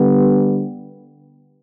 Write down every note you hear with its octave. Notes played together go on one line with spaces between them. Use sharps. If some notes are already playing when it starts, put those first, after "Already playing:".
Already playing: D3 G3 B3